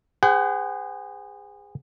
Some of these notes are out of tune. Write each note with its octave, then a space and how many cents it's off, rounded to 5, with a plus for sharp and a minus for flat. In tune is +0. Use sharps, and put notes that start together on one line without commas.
G#4 -30 C5 -40 F#5 +30